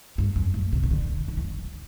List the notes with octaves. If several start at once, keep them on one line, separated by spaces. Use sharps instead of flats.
G2
F#2
A2
C3
C3
D3
D3
E3
D3